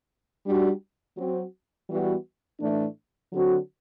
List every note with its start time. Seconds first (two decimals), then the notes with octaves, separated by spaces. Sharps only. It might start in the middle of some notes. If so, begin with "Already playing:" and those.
0.45 G3 D4 F#4
1.16 F#3 C4 F#4
1.88 E3 G3 B3 F#4
2.60 A2 E3 A3 D4
3.31 D3 F#3 C4 F#4